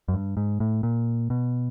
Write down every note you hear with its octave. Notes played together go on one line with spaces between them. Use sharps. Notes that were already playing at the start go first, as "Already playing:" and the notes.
F#2
G2
G#2
A2
A#2
B2